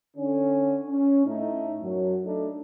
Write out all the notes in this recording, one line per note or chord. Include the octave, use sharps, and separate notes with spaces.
D3 C#4 D4
C#4
A2 A3 D#4
F#2 F#3
A3 D4 D#4